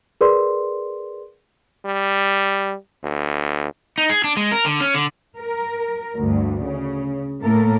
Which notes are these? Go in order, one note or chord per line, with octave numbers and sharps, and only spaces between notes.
G#4 A#4 B4 D5 C6
G3
D2
D#4
G#4
D4
G#3
A#4
D3
C#4
D3
A#4
D2 G2
C#3
A2 A#3 A4 A#4